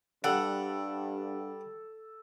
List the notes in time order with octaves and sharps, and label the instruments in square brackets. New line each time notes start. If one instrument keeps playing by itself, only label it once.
[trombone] G2 [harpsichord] G3 [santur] A4 [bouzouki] F#5